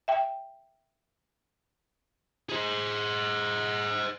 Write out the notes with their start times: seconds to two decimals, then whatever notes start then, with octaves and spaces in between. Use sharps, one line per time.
0.08 E5 G5
2.49 G#4 C5